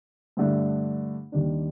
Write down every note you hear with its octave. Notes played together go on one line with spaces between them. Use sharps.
G2 D3 A3 D4
D#2 D#3 G3 A#3 D4